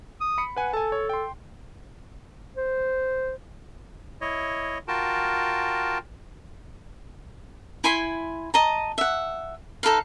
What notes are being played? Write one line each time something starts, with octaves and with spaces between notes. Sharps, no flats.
D#6
B5 C#7
B4 F#5 G#5
A4 G#5 A5
C#5
G5 C6
C5
E4 C#5 D#5
F4 F#4 A#4 G5 A5
E4 G#5 B5 C6
D#5 A5 A#5
E5 F#5
D#4 A4 B4 F5